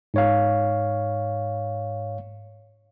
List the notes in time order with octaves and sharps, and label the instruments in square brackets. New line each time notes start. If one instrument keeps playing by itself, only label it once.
[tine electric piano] G#2 C#5 F5